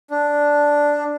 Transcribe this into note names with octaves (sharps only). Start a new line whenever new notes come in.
D4